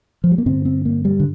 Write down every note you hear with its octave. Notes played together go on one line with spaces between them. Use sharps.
F3
G3
A#3
G2 D3 C4
C4
A#3
G3
D3